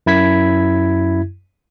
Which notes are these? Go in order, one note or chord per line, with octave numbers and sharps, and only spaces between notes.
F#2 E4 G#6 B6